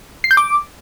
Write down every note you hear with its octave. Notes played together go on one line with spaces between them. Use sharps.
C7
G6
D6